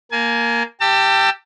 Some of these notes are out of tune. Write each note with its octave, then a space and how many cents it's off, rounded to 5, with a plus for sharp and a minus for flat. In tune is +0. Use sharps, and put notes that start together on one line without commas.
A#3 +0 G#5 +30
G4 +0 A5 +30 E6 +30